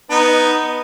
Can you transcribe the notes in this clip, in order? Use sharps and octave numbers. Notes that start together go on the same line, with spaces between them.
B3 D#4